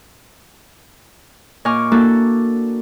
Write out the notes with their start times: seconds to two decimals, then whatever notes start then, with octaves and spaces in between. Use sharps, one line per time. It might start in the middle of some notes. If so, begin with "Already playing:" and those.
1.65 A#2 D#5 G#5 C#6 D6 F6
1.92 A#3 D4 E4 F#4 A4